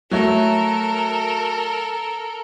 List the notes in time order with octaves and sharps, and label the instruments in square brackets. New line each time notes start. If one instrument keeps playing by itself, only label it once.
[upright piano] F#3 A3 [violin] A4 A#4